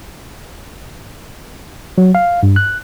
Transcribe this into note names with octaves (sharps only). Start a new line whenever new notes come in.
F#3
F5
G2
F#6